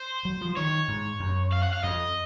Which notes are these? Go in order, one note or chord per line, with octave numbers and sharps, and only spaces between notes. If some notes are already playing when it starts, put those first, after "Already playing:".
Already playing: C5
F#3
F3
D#3 C#5
G#2
F#2
F5
F#5
F5
F2 D#5